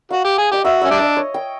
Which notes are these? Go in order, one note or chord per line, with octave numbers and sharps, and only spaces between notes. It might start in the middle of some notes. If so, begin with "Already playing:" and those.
F#4 F5
G4
G#4
G4 D#5
F#4 E5
C#4 E5
G3 D4
D#5
C#5
G5